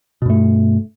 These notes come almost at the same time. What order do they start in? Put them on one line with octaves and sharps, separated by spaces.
B2 G2 A3